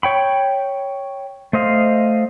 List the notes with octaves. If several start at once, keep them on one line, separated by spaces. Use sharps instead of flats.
C#5 G5 B5
A3 C5 D#5 F5